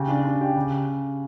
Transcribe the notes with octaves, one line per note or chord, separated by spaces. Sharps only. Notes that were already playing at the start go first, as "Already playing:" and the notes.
Already playing: C#3 G4
D4
D4
G4
C#3